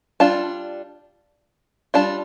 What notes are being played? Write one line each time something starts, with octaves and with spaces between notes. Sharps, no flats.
G3 D4 F4 A5
G3 D4 F4 A5